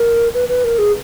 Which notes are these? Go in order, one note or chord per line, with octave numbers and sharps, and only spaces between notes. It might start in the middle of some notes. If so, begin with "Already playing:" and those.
Already playing: A#4
B4
B4
A#4
G#4